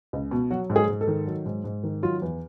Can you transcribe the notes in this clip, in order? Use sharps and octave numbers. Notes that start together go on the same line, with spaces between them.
C#2
B2
F#3 F#4
G#2
G#4
G#2
A4
D#3
F#3
G#2
G#2
D#3
F#3 F4
E2